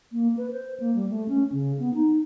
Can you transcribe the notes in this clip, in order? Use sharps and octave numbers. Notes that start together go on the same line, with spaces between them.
A#3
B4
C5
A#3
G3
A3
C#4
C#3
B3
D#4